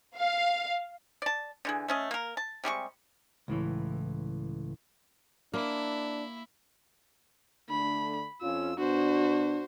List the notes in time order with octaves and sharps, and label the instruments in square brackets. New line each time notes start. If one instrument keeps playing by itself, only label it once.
[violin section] F5
[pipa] D5 A5
D3 E3 G#4
A3 C#4 D#5
A#3 A#4
A5
C3 G3 G#3 C#6
[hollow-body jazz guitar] C#2 A2 E3
[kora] A#3 [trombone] D4 [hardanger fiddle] E4
[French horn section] D3 A3 D4 [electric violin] B5
[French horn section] F2 C#4 F4 [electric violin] E6
[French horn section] B2 B3 D4 [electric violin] F#4 C5